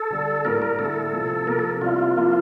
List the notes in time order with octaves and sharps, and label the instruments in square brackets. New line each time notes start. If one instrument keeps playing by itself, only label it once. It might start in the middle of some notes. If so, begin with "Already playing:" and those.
Already playing: [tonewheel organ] A4
[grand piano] D3 G3 D4
[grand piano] A2 G3 A#3 [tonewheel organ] A#4
[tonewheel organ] A#4
[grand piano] D3 A3 E4 [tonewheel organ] A4
[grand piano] C3 F3 A3
[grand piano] C3 F3 A#3 [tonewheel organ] A#4
[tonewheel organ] A4
[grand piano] C3 G3 C4 E4 [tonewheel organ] F4
[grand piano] F3 A#3 E4